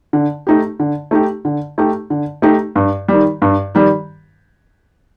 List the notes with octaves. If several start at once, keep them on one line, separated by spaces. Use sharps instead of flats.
D3
A3 D#4 G4
D3
A3 D#4 G4
D3
A3 D#4 G4
D3
A3 D#4 G4
G2
D#3 G3
G2
D#3 G3